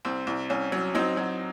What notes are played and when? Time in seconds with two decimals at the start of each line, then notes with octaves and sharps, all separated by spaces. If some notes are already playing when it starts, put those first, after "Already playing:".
0.05 C2 C4
0.27 C2
0.50 C2 C#4
0.72 F#3
0.95 F#3 C4 D#4
1.17 F#3